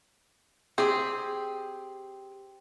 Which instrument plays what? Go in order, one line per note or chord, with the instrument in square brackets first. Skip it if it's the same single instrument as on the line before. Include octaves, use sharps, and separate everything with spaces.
[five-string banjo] C4 [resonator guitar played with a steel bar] G4 G#4